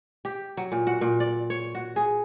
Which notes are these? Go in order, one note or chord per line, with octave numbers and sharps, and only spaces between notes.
G4
F#3
A#2
F#4
A#2
D5
C#5
F#4
G#4